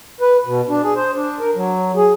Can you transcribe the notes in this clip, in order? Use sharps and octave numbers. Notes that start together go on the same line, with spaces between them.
B4
B2
D4
G#4
C5
D4
A#4
F#3
G#4